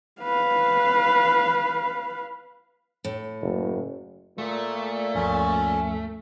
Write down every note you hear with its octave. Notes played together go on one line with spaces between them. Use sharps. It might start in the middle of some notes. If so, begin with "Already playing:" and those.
B4 F5
A2
F#1
A#2 A3
D2 G2 F3 C#4